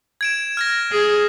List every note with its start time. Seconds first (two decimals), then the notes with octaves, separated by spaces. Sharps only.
0.21 G#6 D7 E7
0.57 F6 G#6 A#6
0.91 G#4